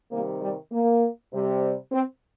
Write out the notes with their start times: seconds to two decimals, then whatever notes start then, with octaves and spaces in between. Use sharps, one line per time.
0.11 C3 D#3 G3 A#3
0.41 G3
0.71 A#3
1.32 C3 G3
1.92 C4